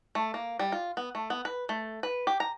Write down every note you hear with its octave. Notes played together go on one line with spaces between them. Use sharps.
A3
A#3
G3
F4
B3
A3
B3
B4
A3
B4
G4
A#5